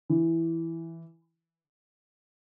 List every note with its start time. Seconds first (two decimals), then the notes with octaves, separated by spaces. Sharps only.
0.09 E3